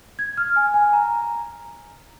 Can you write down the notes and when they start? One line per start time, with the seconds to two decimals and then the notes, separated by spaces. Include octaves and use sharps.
0.19 G#6
0.37 F6
0.56 G#5
0.74 G#5
0.93 A#5